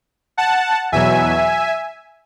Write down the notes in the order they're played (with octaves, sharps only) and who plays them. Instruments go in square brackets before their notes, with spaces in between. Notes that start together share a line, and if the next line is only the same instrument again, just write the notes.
[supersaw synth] F#5 A5
E2 B2 F#3 E5 G#5